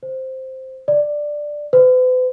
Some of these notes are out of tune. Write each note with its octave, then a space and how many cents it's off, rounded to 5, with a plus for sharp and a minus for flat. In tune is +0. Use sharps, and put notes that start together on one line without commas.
C5 +0
D5 +5
B4 +45